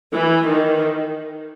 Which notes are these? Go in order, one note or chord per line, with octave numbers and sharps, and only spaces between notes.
E3
D#3